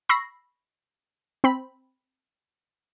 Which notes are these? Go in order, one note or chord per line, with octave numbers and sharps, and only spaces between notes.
B5 C#6 E6 A#6 C7
C4 B5